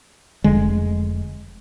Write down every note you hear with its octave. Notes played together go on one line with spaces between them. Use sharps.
F1 D3 G#3